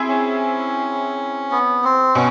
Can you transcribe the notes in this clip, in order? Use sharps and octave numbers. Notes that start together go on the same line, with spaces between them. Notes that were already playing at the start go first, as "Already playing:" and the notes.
Already playing: C4 E4 G#4 C5 E5
C#4
B3
C4
B2 C#4